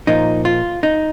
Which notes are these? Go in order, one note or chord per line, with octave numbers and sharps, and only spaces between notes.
A#2 F3 A#3 D#4
F4
D#4